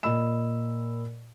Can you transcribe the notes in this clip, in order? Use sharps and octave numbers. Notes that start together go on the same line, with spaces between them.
A#2 D#5 B5 E6 E7